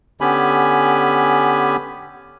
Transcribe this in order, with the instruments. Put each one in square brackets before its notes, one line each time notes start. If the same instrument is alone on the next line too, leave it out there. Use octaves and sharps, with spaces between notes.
[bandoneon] D3 B3 C#4 G4 G#5 B5